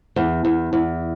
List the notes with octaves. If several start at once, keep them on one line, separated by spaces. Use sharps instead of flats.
E2
E2
E2